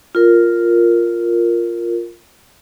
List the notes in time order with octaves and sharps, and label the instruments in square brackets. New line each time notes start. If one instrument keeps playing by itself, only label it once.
[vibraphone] F4 A#4